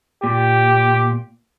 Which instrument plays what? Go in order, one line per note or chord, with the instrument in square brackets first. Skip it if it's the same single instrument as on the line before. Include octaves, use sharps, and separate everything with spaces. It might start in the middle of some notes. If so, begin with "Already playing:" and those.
[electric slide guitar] A#2 [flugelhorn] G4